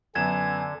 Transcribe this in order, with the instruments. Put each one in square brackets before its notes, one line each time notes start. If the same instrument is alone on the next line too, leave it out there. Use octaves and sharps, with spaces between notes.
[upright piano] F#2 B3 E7 [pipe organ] D3 [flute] G#5 [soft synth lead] G#6